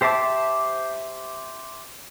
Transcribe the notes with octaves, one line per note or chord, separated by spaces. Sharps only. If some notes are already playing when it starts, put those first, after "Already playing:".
G4 C5 E5 A5 D6